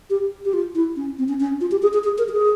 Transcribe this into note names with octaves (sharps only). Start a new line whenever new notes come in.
G4
G4
F4
E4
C#4
C4
C#4
C#4
F4
G4
G#4
G#4
G#4
A#4
G4
G#4